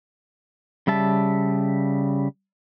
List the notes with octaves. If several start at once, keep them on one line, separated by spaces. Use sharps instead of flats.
C#3 G3 E5 A5